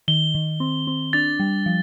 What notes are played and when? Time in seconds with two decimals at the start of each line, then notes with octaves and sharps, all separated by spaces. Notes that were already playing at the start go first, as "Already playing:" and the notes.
0.08 D#3 G7
0.34 D#3
0.60 C4
0.87 C4
1.13 D4 A6
1.39 G3
1.66 F3